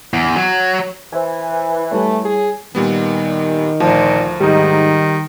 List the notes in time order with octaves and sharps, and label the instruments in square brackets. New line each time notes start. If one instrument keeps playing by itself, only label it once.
[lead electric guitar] E2
F#3
[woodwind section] E3 [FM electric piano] C5 E5 G#5
[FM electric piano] G3 E4 C#5 [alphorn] A3
[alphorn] G#4
[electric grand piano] A#2 G3 B3 [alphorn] D#3
[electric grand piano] D2 [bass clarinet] A#2 [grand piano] F3
[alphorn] G#2 [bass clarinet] D#3 [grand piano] G3 D#4